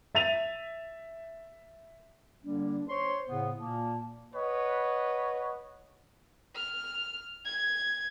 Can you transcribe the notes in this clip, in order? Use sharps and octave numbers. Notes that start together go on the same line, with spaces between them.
E5 A6 D#7 F7
D3 G3 A#3 D4
C5 C#5 C6
A2 C#3 B3
A#2 A#3 A5
B4 C#5 D#5 F#5
F6
G#6